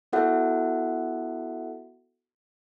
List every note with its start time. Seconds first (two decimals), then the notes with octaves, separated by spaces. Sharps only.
0.13 B3 E4 F#4 A4 E5 F#5